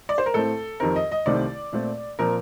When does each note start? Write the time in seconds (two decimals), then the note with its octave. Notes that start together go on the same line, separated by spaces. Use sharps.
0.09 D5
0.18 C5
0.26 A#4
0.34 A2 A3 C4 A4
0.80 F2 D#3 G3 C4 A#4
0.96 D#5
1.11 D#5
1.26 C2 C3 D#3 A3 C4 D5
1.73 A#2 A3 C4
2.19 A#2 F3 C4 A#4